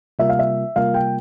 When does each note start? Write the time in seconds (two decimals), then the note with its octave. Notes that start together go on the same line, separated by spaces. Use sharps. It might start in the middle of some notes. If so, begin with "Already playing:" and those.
0.19 C3 G3 A#3 F4 A#4 E5
0.29 F5
0.39 E5
0.76 C3 G3 A#3 F4 A#4 F5
0.94 G5